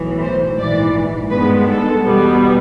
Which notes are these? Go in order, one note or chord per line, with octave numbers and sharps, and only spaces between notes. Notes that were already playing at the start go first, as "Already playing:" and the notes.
Already playing: B1 A2 E3
C5
A#1 G#2 E3 D5
G2 D#3 G#3 B3 B4
A4
E2 B2 G3 B3